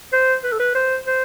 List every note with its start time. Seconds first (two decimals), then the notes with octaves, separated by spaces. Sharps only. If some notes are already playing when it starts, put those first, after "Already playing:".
0.13 C5
0.44 B4
0.52 A4
0.59 B4
0.75 C5
1.07 C5